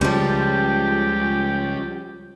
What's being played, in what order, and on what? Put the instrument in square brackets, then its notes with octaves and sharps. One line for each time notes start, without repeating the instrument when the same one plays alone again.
[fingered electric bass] C#2 C#3 [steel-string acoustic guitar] F3 G3 [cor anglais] G4